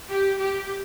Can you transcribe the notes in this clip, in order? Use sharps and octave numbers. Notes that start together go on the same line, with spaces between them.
G4
G4